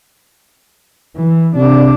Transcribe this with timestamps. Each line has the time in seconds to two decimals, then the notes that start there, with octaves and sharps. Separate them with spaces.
1.17 E3
1.56 C3 D4